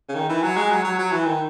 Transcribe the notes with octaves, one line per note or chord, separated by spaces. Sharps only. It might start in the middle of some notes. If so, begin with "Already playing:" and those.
C#3
D#3
E3
F#3
G#3
F#3
F#3
F#3
E3
D#3